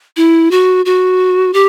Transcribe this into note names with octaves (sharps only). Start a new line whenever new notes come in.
E4
F#4
F#4
G4